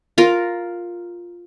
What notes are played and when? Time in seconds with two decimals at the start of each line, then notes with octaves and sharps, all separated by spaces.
0.18 F4 A#4